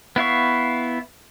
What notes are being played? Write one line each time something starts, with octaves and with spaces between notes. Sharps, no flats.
B3 E4 F5 C#6